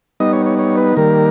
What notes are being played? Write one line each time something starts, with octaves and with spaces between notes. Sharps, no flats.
G3 B3 D#4 D#5
C#5
C#5
C#5
B4
D#3 G3 A#3 A#4